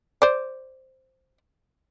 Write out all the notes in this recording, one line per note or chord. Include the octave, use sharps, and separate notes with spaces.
C5 D5